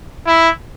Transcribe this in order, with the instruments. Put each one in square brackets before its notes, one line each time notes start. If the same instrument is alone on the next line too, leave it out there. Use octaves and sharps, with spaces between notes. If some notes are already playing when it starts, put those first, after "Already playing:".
[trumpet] E4